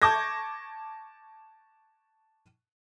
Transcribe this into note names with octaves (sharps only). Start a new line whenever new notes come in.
A5 C#6 D6 G6 G#6 A#6